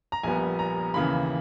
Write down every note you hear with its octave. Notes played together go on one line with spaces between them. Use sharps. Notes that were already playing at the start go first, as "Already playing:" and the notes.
A#5
A#1 A#2 G3 B3 G#5
A#5
D#2 C#3 E3 A#3 B5